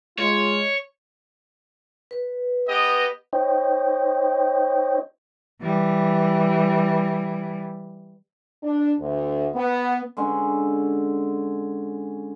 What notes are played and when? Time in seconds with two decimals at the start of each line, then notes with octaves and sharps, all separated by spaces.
0.18 G#3 F4 C#5
2.11 B4
2.68 B3 G4 D#5
3.33 D#4 C5 C#5 D#5 G5
5.61 E3 G3
8.62 D4
8.99 D2
9.55 B3
10.17 D3 G#3 C#4